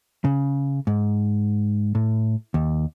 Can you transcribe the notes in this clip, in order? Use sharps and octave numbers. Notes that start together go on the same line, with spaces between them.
C#3
G#2
A2
D#2